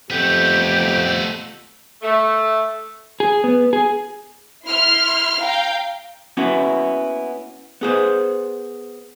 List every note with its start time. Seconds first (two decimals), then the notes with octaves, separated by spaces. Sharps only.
0.10 F2 A3 B3 G4
2.02 A3
3.20 G#4
3.44 B3
3.73 G#4
4.65 E4 C6 F6
5.41 F5 G5 A#5 G6
6.37 A#3 B3 C#4 E4 F#4
7.81 B3 G#4 C5